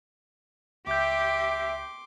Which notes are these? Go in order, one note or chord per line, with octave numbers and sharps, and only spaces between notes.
C#2 G4 E5 C6 D6 G6